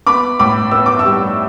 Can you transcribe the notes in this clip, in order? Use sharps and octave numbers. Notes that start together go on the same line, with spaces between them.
B3 B5 D6
A2 B5 D6
B3 E6
D6
C#6 E6
G3